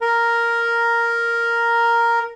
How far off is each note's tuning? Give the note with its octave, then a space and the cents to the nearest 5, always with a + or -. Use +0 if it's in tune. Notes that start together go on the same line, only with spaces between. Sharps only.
A#4 +0 A#5 +0